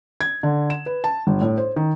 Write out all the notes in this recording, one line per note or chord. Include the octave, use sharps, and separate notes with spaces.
G#6
D3
E7
B4
A5
G1
A2
C5
D#3